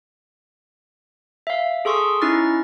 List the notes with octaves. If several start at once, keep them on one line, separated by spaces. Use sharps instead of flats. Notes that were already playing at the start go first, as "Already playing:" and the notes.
E5 F5
G#4 A4 C6 C#6 D#6 E6
C#4 D#4 E4 C#6 F6 A6